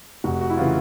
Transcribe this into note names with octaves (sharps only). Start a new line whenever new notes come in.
F1 F#4
F#4
E4
C#3 E3 F4